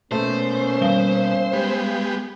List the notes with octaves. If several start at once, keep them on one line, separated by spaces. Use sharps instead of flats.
B2 A3 A#3 C#4 C5
G2 G7
G#3 B3 G4